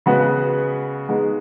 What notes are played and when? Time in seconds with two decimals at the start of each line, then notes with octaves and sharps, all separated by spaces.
0.06 C#3 G#3 B3 F#4 B4
1.09 G#3 B3 D#4